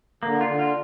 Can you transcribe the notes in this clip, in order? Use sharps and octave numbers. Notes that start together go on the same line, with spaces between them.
D3 A#3
F4
D3
F4